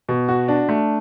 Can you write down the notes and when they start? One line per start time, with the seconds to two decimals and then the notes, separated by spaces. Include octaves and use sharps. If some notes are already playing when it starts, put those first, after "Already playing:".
0.09 B2
0.28 F#4
0.48 D4
0.69 A3